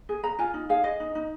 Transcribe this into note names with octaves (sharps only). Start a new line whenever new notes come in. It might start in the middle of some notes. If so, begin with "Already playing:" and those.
G#4
G#4 A#5
F4 G#5
D#4
G#4 F5
G#4 D#5
D#4
D#4